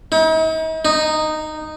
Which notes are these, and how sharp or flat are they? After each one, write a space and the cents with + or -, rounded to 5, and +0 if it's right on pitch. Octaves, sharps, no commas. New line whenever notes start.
D#4 +45
D#4 -10